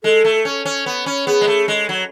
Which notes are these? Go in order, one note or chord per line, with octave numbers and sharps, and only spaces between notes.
G#3 A4
A3
C#4
C#4
B3
C#4
B3 G#4
G#3
A3
G#3
F#3